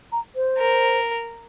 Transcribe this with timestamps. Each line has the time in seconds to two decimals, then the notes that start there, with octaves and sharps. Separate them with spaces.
0.12 A#5
0.35 C5
0.58 A#4